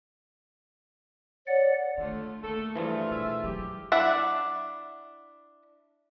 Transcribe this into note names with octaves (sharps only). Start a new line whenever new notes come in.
C#5 D5 F#5
D3 D#3 A3 F4
D3 A3 A#3 A4
G2 E3 F3 A3 F4 G#4
B2 E5
F#3 E4 G4
D4 E4 E5 F#5